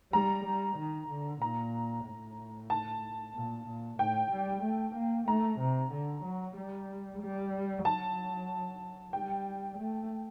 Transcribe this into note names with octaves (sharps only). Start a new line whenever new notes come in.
G3 A#5
G3
D#3
D3
A#2 A#5
A2
A5
A#2
A#2
A2 G5
G3
A3
A#3
A3 A#5
C3
D3
F#3
G3
G3
F#3 A5
G3 G5
A3